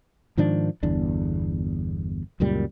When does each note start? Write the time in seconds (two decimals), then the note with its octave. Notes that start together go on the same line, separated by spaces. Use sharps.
0.37 G#2 D#3 F3 D4
0.83 G1 E2 D4
2.40 C#2 F#2 A#2 G3